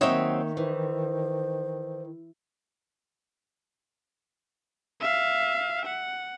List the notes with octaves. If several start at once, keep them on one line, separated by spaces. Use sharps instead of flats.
D#3 F#3 A#3 C4 D#4 C#5 E5
E3 C5
E5 F5
F#5